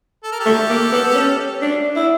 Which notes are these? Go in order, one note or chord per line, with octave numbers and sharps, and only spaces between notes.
A4
A#4
G4 A4
A3
A#3
B3
C#4
D4
E4